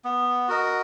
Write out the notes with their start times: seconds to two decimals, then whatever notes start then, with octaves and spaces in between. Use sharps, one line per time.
0.05 B3
0.48 F#4 A#4 D#5